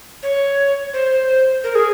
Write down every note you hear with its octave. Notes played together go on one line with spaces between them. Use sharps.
C#5
C5
A#4
G#4